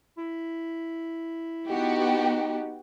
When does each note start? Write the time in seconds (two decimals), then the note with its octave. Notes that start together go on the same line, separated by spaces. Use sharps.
0.18 E4
1.69 B3 D#4 F#4 G4